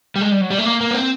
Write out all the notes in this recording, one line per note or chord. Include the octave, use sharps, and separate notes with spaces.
G3
G#3
G3
F#3
G3
A3
A#3
A#3
B3
C4